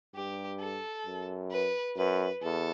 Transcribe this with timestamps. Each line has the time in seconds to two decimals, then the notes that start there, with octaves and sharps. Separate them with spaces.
0.15 G2 G4
0.60 A4
1.06 F#2
1.51 B4
1.97 F#2 B4
2.42 E2 A4